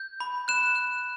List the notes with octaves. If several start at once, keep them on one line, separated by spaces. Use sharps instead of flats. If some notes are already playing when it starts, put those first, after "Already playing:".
Already playing: G6
B5
F#6 E7
F#6